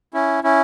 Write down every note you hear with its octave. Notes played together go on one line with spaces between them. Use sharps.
C#4 E4
C#4 E4